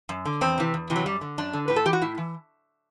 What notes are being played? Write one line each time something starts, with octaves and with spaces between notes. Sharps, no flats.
F#2
D3
E2 C4
C3 E3
E2
C3 E3
F#3
F#2 G3
D3
F#2 D4
D3
A2 B4
A4
E3 G4
F#4
A2 E4
E3